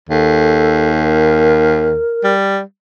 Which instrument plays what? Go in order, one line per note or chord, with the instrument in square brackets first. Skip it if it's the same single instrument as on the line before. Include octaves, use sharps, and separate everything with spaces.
[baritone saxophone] D#2 [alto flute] A4
[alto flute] A#4
[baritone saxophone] G3